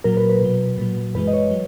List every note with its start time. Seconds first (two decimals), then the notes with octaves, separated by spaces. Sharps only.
0.04 A#2 F#3 A#4
0.17 B4
0.29 B4
0.42 B2 F#3
0.78 A#2 F#3
1.15 F#2 E3 G#3 B4
1.27 D#5
1.33 C#5
1.51 F#3